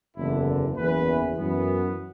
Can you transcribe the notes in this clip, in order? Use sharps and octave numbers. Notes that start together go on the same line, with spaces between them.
F#1 E2 D3 E4
F#1 E2 E3 B4
F#2 E3 B3